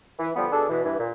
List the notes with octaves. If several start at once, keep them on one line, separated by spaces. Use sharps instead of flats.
E3
D3 F3 G3 B3
B2 D4 G#4 A4
B2 E3
G2 E3
A#2